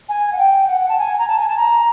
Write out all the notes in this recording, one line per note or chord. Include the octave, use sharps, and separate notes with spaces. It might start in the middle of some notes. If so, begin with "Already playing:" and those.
G#5
F#5
G5
F#5
A5
G#5
A#5
A5
G#5
A5
A#5